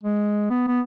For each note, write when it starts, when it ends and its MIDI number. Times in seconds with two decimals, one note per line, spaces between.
0.03 0.46 56
0.50 0.66 59
0.68 0.81 59